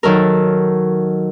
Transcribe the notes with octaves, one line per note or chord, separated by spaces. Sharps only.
D#3 F#3 A4 A#4